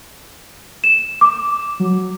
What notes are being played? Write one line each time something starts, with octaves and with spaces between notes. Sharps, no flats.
E7
D6
F#3